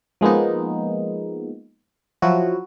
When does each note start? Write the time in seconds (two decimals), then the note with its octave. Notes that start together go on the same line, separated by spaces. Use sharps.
0.21 F3 G#3 A#3 B3 D#4
2.22 F3 F#3 E4 F#4